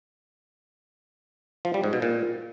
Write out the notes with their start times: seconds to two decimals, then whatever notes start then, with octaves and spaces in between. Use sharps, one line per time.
1.65 F3
1.74 G3
1.84 G#2
1.93 B2
2.02 A#2